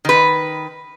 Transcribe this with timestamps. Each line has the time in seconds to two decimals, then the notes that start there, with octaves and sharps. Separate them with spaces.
0.05 D#3 B4